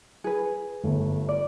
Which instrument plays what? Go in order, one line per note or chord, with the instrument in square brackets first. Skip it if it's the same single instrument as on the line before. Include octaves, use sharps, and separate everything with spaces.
[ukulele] G#4 B4
[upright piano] G1 A3
[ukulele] D5